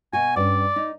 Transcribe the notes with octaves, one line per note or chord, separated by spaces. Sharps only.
B2 F#4 G#5
G2 C#4 D5
D#4